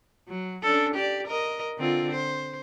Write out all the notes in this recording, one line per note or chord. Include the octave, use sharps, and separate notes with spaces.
F#3
C#4 D4 A4
G4 D5
A#4 D#5
D3 C4 F4
C5